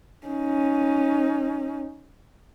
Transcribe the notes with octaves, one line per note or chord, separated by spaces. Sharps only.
C#4 D#4